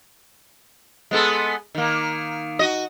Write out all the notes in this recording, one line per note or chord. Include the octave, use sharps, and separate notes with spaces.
G#3 B3 A4
D#3 A#3
F#4 D#5